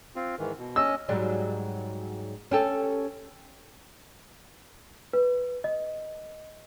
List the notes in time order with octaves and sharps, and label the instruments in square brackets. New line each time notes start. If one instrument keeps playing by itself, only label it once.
[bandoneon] C4 F4
G#2 D#3 E3
B2
[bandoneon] C#4 D#5 [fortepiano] E6
[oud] G#2 F#3 G3
C#4 G4 A4
[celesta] B4
D#5